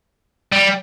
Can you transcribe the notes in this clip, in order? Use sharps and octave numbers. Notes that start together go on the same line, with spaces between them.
G3